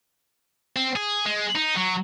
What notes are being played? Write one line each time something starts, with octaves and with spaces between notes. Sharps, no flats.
C4
G#4
G#3
D#4
F#3